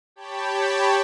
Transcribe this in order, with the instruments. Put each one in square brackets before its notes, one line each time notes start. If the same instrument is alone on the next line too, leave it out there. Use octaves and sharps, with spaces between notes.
[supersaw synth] G4 C#5 G5 A5 B5